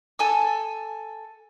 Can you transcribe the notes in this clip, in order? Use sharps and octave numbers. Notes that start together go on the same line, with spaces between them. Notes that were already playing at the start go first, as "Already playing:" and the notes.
A4 G#5 E6